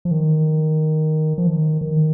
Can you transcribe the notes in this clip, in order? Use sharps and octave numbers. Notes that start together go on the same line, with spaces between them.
F3
D#3
F3
D#3
D#3